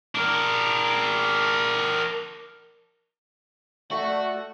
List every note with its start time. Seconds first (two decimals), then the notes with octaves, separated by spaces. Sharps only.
0.15 D4 A#4
3.91 A3 F#4 D5